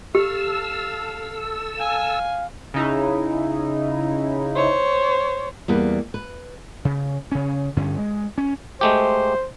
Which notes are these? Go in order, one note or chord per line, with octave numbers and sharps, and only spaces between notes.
G4 A4 F5 E6
F5 G#5
C#3 D#4 E4
C5 C#5
E2 G3 A#3 B4
B4
C#3
C#3 C#4
G2 D3 C#4
G#3
C#4
G#3 A3 G4 C5